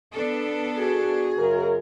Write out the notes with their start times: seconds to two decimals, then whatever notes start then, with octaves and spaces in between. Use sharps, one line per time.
0.14 B3 D4 A4
0.77 F#4 G#4
1.39 F#2 C#3 A#4